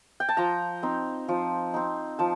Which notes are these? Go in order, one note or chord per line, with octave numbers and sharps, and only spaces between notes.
G5
A5
F3 A#5
C4 D#4
F3
C4 D#4
F3 A5